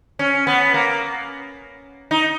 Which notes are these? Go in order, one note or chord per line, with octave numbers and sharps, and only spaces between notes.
C#4
B3
A#3
D#4